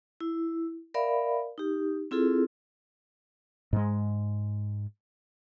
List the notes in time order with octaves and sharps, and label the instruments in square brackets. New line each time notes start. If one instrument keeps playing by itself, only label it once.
[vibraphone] E4
A#4 D5 E5 F5 B5
D#4 G4
C4 E4 F4 G#4 A4
[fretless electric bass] G#2 G#3